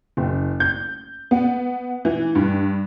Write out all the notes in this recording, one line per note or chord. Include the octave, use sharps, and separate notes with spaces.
F#1
G6
B3
E3
G2